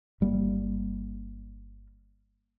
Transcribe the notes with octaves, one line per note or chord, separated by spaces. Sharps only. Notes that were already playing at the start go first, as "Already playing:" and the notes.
G1 G3 A#3